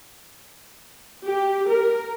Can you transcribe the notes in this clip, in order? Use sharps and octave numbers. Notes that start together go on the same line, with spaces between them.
G4
A#4